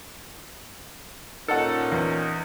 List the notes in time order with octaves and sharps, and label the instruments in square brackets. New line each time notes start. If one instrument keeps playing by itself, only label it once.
[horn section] A#2 C#4 D#4 [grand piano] A4 F#5
[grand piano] E2